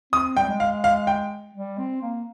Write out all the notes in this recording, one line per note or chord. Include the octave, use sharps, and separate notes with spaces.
C4 D#6
G3 G5
G#3
F5
F5
G5
G3
C4
A#3